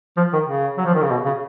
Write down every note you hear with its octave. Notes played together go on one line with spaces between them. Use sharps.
F3
D#3
C#3
F#3
F3
D#3
C#3
B2
C#3